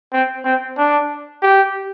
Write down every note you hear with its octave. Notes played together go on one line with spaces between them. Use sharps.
C4
C4
D4
G4